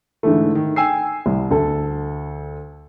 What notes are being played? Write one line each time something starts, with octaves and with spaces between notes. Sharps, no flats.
G#2 D3 E3 A3
D#3
G5 G#5 E6 C7
C2
D2 A4